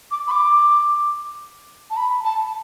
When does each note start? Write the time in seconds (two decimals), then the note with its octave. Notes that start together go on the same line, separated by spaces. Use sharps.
0.11 D6
0.28 B5
0.31 D6
1.90 A5
1.97 B5
2.24 A5